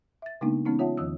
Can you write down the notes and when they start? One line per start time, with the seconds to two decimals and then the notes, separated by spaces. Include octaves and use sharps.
0.22 E5 A6
0.41 C#3 G#3 A#3 B3 D4 D#4
0.66 E3 G#3 B3 C#4 D#4
0.79 F4 C#5 E5 F#5 A5
0.97 E2 D#3 F3 D#6 E6